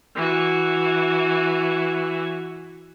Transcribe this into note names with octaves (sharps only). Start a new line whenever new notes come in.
E3 F#4